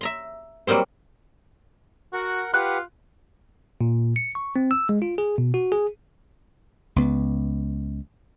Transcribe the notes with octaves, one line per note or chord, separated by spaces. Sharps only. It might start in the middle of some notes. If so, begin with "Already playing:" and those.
E5 A#5 C6
F#3 G3 A#3 C4 C5
F#4 A#4 F#5
F4 G4 B4 F#5 F#6
A#2
C#7
C#6
C4
E6
G#3
F4
G#4
B2
F#4
G#4
C#2 B3